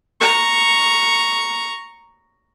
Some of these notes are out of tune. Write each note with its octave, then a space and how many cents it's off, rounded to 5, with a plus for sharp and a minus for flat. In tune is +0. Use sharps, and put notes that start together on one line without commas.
A#5 +0 C#6 +0